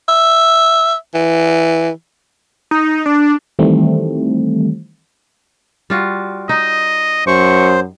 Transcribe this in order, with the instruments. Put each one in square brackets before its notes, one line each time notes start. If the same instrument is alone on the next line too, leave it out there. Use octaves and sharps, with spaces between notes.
[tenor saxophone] E5
E3
[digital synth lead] D#4
D4
[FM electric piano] D#3 E3 G3 A3 C4
[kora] G3 F4 F#4
[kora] D#4 [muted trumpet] D#5
[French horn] F#2 [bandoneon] C5 [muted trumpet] C#6